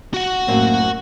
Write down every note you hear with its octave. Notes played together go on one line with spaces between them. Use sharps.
F#4 F#5
F#2 A2 A#3 C4